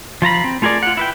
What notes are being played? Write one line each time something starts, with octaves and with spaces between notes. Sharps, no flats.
F3 F4 A#5 B5
C4
A3 F4 G#4 A#4 D5
F4 F#5
E4 B4 G5